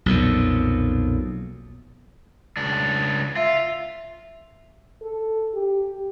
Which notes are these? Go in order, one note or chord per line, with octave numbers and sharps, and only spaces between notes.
B1 F2 A#2
C#2 D4
F4 E5
A4
G4